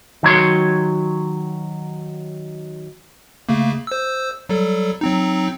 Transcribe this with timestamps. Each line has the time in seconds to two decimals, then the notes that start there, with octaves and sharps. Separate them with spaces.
0.23 D#3 F#3 C#5 C6
3.49 C#3 A3 A#3
3.87 C5 E6
4.49 F#3 G3 A4
5.01 F#3 C4 D#4